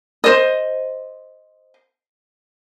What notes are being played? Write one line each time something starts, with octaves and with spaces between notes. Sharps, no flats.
C5 D#5